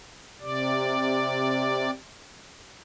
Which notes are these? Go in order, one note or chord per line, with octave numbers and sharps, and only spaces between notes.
C3 D5